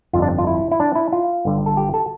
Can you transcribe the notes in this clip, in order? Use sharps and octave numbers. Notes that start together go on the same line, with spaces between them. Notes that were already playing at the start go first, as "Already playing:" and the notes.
G1 F2 D3 G3 F4
D4
F4
E4
E4
D4
E4
F4
G1 G2 D3 G3
A4
G4
A4